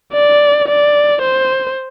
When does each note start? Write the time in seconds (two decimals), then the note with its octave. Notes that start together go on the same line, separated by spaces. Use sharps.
0.14 D5
0.68 D5
1.22 C5